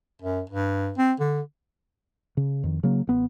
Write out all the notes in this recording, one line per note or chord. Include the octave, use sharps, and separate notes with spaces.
F#2
G2
C4
D3
C#3
F2 D#3
C#3 F#3 A#3
A1 B3